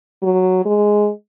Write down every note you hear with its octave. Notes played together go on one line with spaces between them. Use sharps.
F#3
G#3